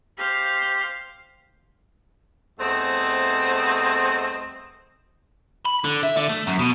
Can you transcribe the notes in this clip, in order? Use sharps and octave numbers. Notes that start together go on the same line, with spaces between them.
G4 C5 F5
E2 G3 A3 C4 C5 D#5
B5
D3
E5
D3
A3
F#2
B2